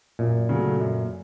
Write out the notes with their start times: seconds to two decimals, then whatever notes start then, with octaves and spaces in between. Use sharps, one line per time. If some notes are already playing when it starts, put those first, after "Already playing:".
0.19 F#2 A#2
0.49 C#3 F#3 A3
0.80 F#2